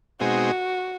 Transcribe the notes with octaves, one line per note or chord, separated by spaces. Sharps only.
B2 G#3 C4 D#4 F#4 G#4